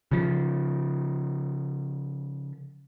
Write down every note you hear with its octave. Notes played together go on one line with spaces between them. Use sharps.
C#3 F3